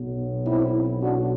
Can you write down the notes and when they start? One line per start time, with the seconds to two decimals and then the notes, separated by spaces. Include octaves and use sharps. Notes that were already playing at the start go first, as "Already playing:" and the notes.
Already playing: B1 B2 F#3
0.45 C4 E4
1.02 D4 F#4